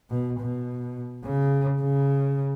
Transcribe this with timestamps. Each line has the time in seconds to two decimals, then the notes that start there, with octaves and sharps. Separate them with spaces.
0.10 B2
0.40 B2
1.24 C#3
1.81 C#3